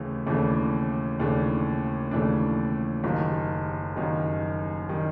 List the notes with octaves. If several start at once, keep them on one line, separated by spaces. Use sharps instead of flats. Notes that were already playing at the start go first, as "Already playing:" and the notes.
Already playing: D#2 C#3 E3 A3
D#2 C#3 E3 A3 D4
D#2 C#3 E3 A3 D4
D#2 C#3 E3 A3 D4
F#1 F#2 D#3 G3
F#1 F#2 D#3 G3
D#3 G3